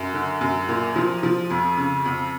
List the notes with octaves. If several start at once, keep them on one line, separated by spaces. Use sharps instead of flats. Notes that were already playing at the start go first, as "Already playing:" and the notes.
Already playing: F#2
D3
F#2
A#2
F3
F3
F2
C#3
F2